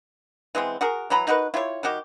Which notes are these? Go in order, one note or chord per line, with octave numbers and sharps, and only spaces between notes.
E3 G#3 B3 C4
F#4 G#4 A#4
E3 F#3 A#5 B5
D#4 F#4 A#4 B4
E4 F4 G4 C#5
D#3 G3 F#4 G4